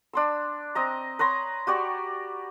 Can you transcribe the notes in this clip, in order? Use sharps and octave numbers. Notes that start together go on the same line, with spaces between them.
D4 C6 E6
C4 D#5 A#5
B4 C#5 A#5 C6
F#4 G4 D5 C#6